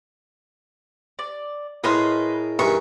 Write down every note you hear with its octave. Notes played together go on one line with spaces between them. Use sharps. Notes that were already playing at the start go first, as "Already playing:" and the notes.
D5
A2 G#4 A#4 B4 D#5 C6
G2 D#3 E3 C#6